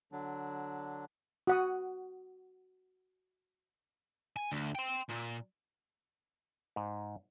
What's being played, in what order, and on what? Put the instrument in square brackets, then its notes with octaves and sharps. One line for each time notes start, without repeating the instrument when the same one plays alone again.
[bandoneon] D3 F#3 D4
[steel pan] F#4 F#5 D#6
[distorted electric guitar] G#5
D2
G5 C6
A#2
[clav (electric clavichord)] G#2